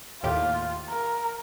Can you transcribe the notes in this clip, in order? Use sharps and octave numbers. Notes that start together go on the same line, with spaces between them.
D#2 A2 F4 G4
A#4